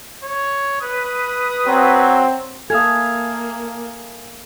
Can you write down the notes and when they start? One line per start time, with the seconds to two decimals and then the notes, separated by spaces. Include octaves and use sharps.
0.23 C#5
0.81 B4 D#6
1.67 F#3 C4
2.70 A#3 A4 E5 F5 G#5 D#6 G#6